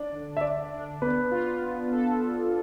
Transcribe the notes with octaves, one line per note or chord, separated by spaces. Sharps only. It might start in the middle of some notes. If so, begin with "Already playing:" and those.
Already playing: D4 D5
D3
E5
D3 D5
D4
B3 B4
F4
B3
A4